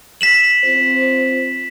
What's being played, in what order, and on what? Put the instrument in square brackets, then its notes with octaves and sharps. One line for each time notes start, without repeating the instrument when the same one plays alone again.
[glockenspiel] B6 E7 F#7
[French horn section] C4 F4 C5